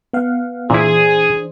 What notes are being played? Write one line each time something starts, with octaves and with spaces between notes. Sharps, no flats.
B3 F5 F#5
A#2 E3 D4 E4 G#4 C5